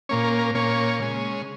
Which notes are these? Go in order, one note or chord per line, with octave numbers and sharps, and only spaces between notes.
A#2 A#3 C#4 C#5
A#4
A#4
A#2 A#3 C#4 C#5
C#3 G#3 C#4